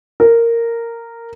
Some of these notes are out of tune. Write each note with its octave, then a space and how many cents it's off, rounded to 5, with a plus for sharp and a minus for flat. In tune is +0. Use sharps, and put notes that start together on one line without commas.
A#4 -10